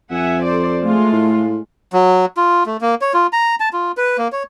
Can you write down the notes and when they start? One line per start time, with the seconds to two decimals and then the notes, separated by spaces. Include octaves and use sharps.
0.11 F2 E5 F#5 G#5
0.43 A4 C5 D5
0.81 G#3 A3 F4
1.13 A2
1.93 F#3
2.37 F4
2.66 A3
2.81 A#3
3.01 C#5
3.14 F4
3.33 A#5
3.60 A5
3.73 F4
3.97 B4
4.18 A#3
4.32 C#5